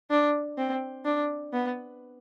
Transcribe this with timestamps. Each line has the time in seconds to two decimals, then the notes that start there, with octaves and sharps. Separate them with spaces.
0.10 D4
0.58 C4
1.05 D4
1.53 B3